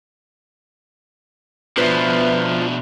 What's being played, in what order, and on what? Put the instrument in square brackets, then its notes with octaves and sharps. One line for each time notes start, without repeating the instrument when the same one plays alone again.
[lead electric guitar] B2 D4 [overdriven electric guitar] F3 [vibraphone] B3 E5 [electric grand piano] B4